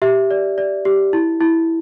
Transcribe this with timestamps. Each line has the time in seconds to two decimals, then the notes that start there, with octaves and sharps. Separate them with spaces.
0.02 G4 E5
0.31 D5
0.58 D5
0.85 G4
1.13 E4
1.41 E4